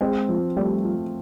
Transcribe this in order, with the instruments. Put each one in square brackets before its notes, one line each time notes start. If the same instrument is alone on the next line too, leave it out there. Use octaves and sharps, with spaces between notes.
[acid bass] G#3 [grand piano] C4
[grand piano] F3
[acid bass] G3 [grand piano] A3
[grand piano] F4